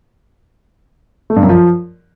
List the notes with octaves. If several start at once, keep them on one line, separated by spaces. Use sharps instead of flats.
A3
G2
F#2
F3